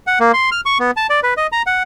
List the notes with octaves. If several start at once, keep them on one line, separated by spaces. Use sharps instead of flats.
F#5
A#3
C6
F6
C#6
B3
A5
D5
B4
D#5
A#5
F#5